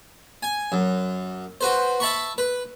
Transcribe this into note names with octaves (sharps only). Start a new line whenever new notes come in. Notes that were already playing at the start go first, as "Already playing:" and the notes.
G#5
F#2
F#4 B4 C5
E5 A5 B5 C#6
B4